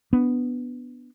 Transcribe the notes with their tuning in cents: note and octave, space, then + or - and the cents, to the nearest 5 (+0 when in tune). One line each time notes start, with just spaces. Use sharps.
B3 +0 D4 +0